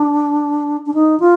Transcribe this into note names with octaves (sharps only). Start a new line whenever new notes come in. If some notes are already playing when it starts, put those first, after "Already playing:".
Already playing: D4
D4
D#4
F4